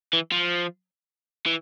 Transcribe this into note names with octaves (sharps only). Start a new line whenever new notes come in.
E3
F3
E3